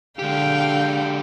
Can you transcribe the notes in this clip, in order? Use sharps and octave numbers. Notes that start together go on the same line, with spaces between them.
D3 G#3 G4 F5 G5